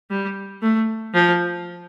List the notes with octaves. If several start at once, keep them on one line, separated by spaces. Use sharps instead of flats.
G3
A3
F3